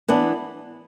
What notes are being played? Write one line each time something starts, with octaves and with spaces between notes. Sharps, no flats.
E3 B3 D4